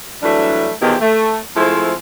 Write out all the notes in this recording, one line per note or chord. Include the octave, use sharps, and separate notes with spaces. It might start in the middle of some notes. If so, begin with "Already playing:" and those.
E3 F#3 G3 A3 D4
E2 B2 D#3 F3 E4 G4
A3
F3 G#3 A3 C4 E4